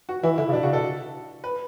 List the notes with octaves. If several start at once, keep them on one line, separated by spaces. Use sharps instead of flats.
F#4
E3 E4
D3 E4
C#3
B2 D4
C#3 F#4
B2 A4
B4